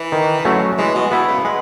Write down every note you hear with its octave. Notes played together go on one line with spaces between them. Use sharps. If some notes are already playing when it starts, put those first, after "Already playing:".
Already playing: E3
D#3
F#3 A3 C#4 F#4
E3 G#3
B2
B2 B3 E4
C#3
G#3 B3